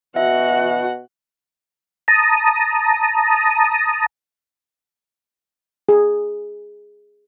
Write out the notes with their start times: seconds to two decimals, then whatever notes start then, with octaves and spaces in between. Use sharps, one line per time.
0.16 B2 F#4 E5 F#5
2.08 A5 A#5 D#6
5.89 G#4